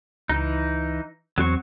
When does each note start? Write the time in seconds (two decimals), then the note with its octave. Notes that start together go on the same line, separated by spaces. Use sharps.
0.29 C#2 E3 D#4
1.38 E2 F#3 C4 C#6